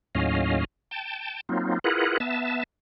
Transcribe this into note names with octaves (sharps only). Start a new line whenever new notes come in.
D#2 A2 F#3 C#4 D#5 F5
G5 A5
F#3 A#3 C4 D#4 F4
E4 F4 G#4 A#4 B4 F#5
B3 E5 A5